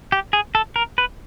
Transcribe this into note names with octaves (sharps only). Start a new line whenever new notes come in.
G4
G#4
A4
A#4
B4